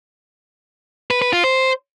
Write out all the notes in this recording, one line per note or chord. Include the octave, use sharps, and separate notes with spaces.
B4
B4
F4
C5